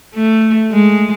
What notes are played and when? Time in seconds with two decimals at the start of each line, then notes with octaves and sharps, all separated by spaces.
0.15 A3
0.72 G#3